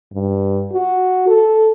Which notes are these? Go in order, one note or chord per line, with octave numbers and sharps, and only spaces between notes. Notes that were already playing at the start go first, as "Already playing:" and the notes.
G2
F#4
A4